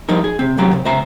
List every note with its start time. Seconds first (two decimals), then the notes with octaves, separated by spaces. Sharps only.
0.09 G2 F3 G3 D#4 A#4
0.24 G#4
0.39 C3 C4
0.57 C2 F#2 F#3 G4 A#5
0.73 C3
0.85 C#2 C5 E5 A#5